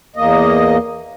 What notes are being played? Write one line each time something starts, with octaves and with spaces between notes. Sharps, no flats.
E2 A#3 D#5